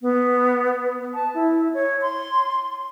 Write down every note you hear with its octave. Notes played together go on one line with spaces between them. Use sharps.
B3
A5
E4
C#5
C6